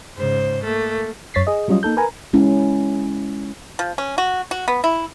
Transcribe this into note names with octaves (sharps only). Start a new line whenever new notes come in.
G#2 C#3 C5
A3 A#3
F#2 C#5 A6 B6 C7
G#4 D#5
F#3 G3 C#4 F4 D#5
A#3 D#4 A4 G6
A#4 B4 G#5 A#5
G#3 C#4 E4
F3
C#4
F#4
F#4
B3
E4